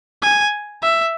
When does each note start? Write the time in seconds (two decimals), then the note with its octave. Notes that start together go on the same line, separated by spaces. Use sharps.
0.22 G#5
0.82 E5